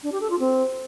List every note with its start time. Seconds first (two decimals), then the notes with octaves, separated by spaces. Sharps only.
0.02 D4
0.11 G4
0.20 A4
0.30 F4
0.39 C4